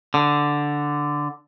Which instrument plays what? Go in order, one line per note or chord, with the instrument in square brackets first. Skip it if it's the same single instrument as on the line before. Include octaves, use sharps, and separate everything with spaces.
[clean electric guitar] D3